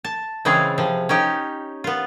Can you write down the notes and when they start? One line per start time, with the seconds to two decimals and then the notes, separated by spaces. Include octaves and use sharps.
0.05 A5
0.45 C#3 E3 G#3 C4 F4 G#4
0.78 C3 F3
1.09 C#4 D#4 G4
1.84 B3 F4